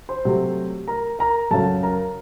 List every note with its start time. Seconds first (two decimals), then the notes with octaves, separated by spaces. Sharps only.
0.09 C5 C6
0.25 C3 F#3 A3
0.88 A#4 A#5
1.19 A#4 A#5
1.51 F#2 C#3 F#3 A4 A5
1.83 A#4 A#5